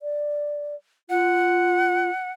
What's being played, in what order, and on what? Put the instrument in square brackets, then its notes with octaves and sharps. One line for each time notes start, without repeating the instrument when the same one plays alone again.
[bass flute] D5
[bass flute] F4 [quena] F#5